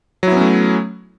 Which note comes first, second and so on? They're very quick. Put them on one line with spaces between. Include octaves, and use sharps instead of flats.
F#3 E4 B3 C#4 A3